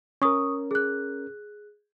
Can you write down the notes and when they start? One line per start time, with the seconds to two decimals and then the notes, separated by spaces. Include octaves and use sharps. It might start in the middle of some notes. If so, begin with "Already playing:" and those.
0.22 C#4 A#4 C#6 D#6
0.71 G#4 F#6